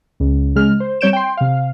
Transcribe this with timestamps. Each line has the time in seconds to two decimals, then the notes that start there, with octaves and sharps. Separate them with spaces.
0.20 C#2
0.55 C#3 G#3 F6
0.80 C5
1.01 G3 C4 C#5 G6 D7 E7
1.13 G5 C6
1.37 C3 F5